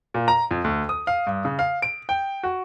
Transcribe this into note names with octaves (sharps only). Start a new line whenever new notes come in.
A#2
A#5
F2
D2
D#6
F5
G2
C#3
F5
D7
G5
F#4